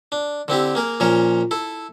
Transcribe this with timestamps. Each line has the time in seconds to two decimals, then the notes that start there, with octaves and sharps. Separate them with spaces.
0.12 D4
0.48 D3 C4 E4 G4
0.75 A#3 G#4 A#4
1.00 A#2 F3 C#4 A#4 C#5
1.51 E4 A4